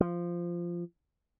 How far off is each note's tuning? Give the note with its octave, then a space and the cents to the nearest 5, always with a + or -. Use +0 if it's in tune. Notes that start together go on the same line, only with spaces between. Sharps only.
F3 -10